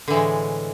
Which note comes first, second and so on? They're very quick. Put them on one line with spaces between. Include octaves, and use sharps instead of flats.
D3 E3 A2 G#3